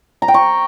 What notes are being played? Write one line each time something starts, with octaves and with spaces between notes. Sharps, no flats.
A#5
G5
C#6